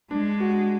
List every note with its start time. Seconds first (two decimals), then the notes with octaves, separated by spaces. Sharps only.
0.11 G#3 D4
0.40 F#4